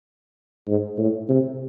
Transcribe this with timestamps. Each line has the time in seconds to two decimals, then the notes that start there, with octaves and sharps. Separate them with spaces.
0.68 G#2
0.98 A2
1.29 C3